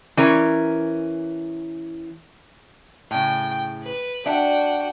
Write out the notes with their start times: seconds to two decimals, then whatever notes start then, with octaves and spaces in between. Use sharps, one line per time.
0.17 E3 C#4 A#4
3.11 A2 C#3 G5
3.83 B4
4.26 D4 F#4 E5 F#5 G5